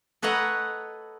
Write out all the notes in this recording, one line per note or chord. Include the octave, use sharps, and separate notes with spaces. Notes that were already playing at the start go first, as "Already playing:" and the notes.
A4 B4 C#5 D#5 F#5 A#5